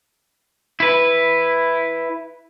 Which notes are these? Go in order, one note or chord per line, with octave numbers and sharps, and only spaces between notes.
E4 B4